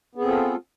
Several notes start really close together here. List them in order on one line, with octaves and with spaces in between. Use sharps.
B3 G#4 C4 A4 F4